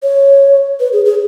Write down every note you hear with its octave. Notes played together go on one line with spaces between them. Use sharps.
C#5
B4
G#4
G#4